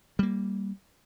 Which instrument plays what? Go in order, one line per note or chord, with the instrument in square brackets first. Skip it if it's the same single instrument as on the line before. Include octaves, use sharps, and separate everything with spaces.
[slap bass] G3 A#3